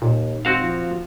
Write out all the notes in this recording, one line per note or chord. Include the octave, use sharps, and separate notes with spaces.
D#2 A#2
G#1 C4 F#4 F5
F3